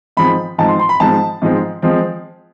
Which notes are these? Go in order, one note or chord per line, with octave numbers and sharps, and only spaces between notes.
G#2 F3 G#3 C4 B5
G#2 F3 G#3 C4 A5
C6
C6
B5
G#2 F3 G#3 C4 A5
G#2 F3 G#3 C4
F3 G#3 C4